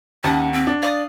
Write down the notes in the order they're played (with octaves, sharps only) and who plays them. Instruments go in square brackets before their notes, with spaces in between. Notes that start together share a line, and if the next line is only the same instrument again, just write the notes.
[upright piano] D#2 [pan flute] C#4 [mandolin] F#5 A5
[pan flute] C4
[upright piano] D4
[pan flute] D5 [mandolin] F5 D6 D#6